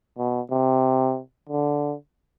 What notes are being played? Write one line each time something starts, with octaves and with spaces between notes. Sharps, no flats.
B2
C3
D3